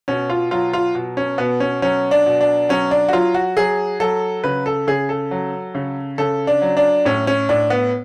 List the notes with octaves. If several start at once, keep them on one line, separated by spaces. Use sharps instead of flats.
B2 C#4
F4
F#3 F4
F4
B2
C#4
B2 B3
C#4
F#3 C#4
D4
B2
D4
F#3 C#4
D4
F#4
F#3 F4
F#4
F#3 G#4
F#3 A4
C#3 B4
A4
C#3 G#4
A4
F#3
C#3
C#3 A4
D4
F#3
D4
A2 C#4
C#4
A2 D4
B3